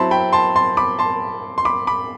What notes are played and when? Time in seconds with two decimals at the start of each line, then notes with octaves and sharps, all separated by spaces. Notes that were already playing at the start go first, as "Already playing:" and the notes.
Already playing: F#3 C4 E4 A5 B5 C6
0.11 G5 B5
0.33 A5 C6
0.56 A5 C6
0.77 B5 D6
0.99 A5 C6
1.58 C6
1.65 B5 D6
1.87 B5 D6